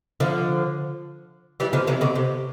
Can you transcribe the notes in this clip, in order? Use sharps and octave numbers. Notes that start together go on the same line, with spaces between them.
D3 F3
E3 G3
D3 F3
C3 E3
B2 D3
C3